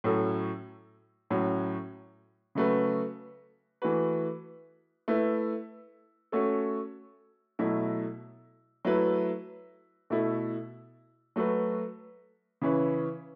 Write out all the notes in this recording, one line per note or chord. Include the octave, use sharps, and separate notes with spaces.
A2 F#3 C#4 A4
A2 F#3 C#4 F#4
C#3 F#3 A3 F#4 B4
E3 A3 F#4 B4
A3 E4 B4
A3 C#4 F#4 A4
B2 F#3 A3 E4
F#3 A3 E4 B4
B2 A3 E4 A4
F#3 A3 F#4 B4
C#3 E3 C#4 E4 B4